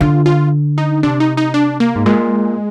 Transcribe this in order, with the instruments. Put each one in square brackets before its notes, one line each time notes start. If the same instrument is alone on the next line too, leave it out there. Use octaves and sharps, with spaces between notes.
[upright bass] D3 [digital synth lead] F4
[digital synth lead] F4
D#4
[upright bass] C3 [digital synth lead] D4
[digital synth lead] D#4
D#4
D4
A#3
[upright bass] G#2
[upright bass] A#2 [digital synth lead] G#3